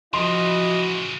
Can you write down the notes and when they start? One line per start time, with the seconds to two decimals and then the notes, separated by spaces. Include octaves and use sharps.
0.14 C#3 E3 F3 E4 F#4 D#5 C6